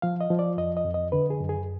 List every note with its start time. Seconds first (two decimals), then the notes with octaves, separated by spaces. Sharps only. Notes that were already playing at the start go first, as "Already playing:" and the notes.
0.02 F3 F5
0.21 D#5
0.30 F3
0.39 D5
0.57 F2 D#5
0.77 D#5
0.85 F2
0.94 D#5
1.12 D3 B4
1.30 G#4
1.40 F#2
1.49 G#4